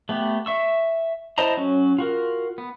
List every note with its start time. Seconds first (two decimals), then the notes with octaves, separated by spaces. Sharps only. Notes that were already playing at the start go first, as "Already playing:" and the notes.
0.09 A3 B3 G4
0.46 E5 C#6 E6
1.38 E4 C5 D#5 A5 A#5
1.57 F#3 C#4 F#4
1.98 F4 F#4 A#4
2.58 B3